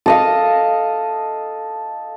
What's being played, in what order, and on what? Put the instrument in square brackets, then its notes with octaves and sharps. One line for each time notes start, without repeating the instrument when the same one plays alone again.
[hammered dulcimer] A4 D#5 F5